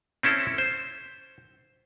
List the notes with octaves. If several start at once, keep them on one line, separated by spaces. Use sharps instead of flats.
C4 C#4 E4 A4
C5